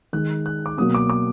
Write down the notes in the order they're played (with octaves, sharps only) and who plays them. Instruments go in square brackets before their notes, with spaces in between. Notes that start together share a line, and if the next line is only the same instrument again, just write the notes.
[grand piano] D#3 G#3 F#6
F#6
D6
B2 F#3 A#3 D#6
D6
D6